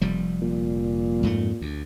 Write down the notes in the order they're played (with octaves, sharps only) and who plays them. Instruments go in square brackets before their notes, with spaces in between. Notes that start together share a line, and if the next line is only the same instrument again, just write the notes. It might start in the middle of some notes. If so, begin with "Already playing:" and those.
[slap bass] F1 F3 G3
[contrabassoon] A#2
[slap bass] F2 G#2 A3
D2